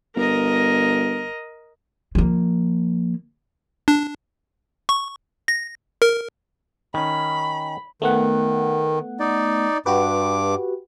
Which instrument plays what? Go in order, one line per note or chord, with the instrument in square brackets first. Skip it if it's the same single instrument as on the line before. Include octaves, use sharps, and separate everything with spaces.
[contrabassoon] G1 [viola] A#4 D#5
[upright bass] F3 A#3
[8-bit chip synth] D4
C#6
A#6
A#4
[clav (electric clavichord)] D#3 C#4 [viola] B5
[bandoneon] D#3 [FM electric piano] A3 B3 F#5
[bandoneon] D#4 D5
[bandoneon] G2 D6 [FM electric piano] F#4 G4 B4